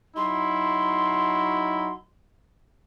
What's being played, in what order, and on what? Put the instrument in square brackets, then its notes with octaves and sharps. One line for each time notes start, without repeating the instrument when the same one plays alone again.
[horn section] F#3 D#4 E4 [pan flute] C6